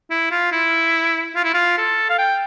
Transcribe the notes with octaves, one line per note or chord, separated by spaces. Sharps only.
E4
F4
E4
F4
E4
F4
A4
F5
G5